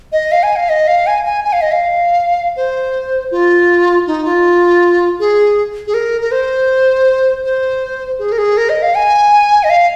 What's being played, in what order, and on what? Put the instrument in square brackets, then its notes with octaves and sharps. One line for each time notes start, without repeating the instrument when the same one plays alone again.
[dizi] D#5
F5
G#5
F5
D#5
F5
G#5
G#5
G#5
F5
D#5
F5
C5
F4
D#4
F4
G#4
G#4
A#4
A#4
C5
C5
G#4
A#4
G#4
A#4
D#5
F5
G#5
D#5
F5